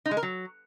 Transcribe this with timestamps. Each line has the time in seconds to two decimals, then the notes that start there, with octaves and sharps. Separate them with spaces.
0.06 D#4
0.11 G#3
0.17 A#4
0.23 F#3